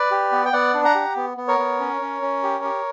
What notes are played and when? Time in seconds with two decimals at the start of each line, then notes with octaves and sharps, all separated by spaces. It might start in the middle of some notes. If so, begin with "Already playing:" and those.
Already playing: B4 D5
0.11 G4
0.32 B3
0.45 G5
0.53 B3 D5 F#5
0.74 D4
0.84 F#5 A#5
0.95 G4
1.16 B3
1.37 B3
1.48 A#4 C#5
1.59 B3
1.80 C#4
2.01 C#4
2.22 C#4
2.43 G4
2.64 G4